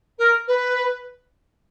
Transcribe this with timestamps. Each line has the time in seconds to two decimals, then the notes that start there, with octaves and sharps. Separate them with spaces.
0.18 A#4
0.47 B4